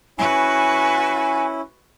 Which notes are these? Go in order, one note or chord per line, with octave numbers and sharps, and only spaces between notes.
C#4 E4 F#4 B4 G#5